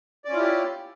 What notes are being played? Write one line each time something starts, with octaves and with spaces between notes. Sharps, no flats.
C#4 E4 F4 G4 D5